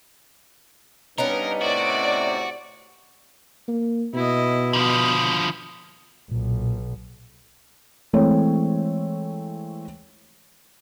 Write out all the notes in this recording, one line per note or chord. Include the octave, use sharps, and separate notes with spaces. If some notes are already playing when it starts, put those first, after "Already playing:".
G2 B3 C#4 D#4 A#4
A2 C3 F#4 D5
A#3
B2 E4 D#5
D3 F3 B5 D#6
B1 A#2
E3 G#3 A3 C4 C#5